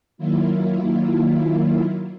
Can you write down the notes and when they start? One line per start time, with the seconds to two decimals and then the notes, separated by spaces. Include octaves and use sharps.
0.18 D#3 F#3 A#3 E4 F4